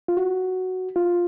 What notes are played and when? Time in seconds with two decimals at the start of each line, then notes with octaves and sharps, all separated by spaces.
0.08 F4
0.17 F#4
0.96 F4